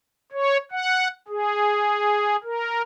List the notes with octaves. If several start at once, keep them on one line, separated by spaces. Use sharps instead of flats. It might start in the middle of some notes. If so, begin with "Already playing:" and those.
C#5
F#5
G#4
A#4